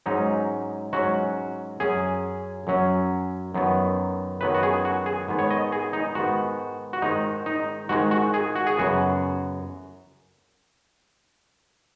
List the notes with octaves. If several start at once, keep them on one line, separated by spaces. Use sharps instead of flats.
G#2 F#3 C#4 D#4
G#2 F#3 C#4 F#4
F#2 F#3 C#4 G#4
F#2 F#3 C#4
F#2 D#3 F#3 B3
F#2 D#3 F#3 B3 B4
F#4
G#4
F#4
G#4
G#2 D#3 B3
C#5
D#5
G#4
D#4
G#2 D#3 B3 F#4
F#4
G#2 D#3 G#3 D#4
D#4
G#2 D#3 G#3 F#4
F#4
G#4
F#4
G#4
F#2 C#3 B3 F#4